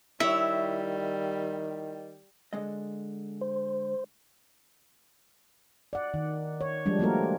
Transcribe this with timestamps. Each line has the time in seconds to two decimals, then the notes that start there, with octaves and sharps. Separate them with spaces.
0.20 D#3 G3 E4 C#5 E5
2.53 D3 G#3 D#5
3.41 C5
5.93 D5 F#5
6.14 D#3
6.61 C#5
6.86 F3 G3 G#3 D4
6.99 F3 G3 A3 A#3 F#4 A#4